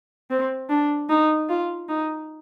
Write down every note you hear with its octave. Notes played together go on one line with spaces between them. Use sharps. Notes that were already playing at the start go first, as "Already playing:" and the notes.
C4
D4
D#4
F4
D#4